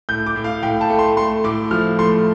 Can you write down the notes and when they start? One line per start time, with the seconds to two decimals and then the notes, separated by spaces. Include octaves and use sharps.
0.09 A2 G6
0.26 D6
0.36 A2
0.44 F5
0.63 A2 G5
0.81 A5
0.90 A3
0.99 C6
1.17 A3 C6
1.44 A2 D6
1.71 F3 F6
1.99 A3 C6